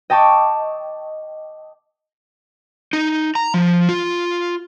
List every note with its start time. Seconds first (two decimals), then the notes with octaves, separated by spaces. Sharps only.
0.10 D#5 G5 A5 C#6 D6
2.93 D#4
3.35 A#5
3.54 F3
3.89 F4